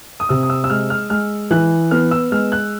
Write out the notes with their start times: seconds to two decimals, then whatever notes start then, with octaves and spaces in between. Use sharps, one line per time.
0.20 D#6
0.29 C3 E6
0.43 D#6
0.50 E6
0.64 E6
0.70 G#3 F6
0.90 F6
1.10 G#3 F6
1.51 E3 F#6
1.91 B3 F6
2.11 E6
2.32 G#3 F6
2.52 F#6